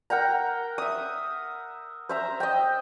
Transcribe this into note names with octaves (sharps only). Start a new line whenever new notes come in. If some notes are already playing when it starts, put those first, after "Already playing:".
A#4 F#5 G5 A#5
E5 D#6
C5 E5 A#5
D#5 G5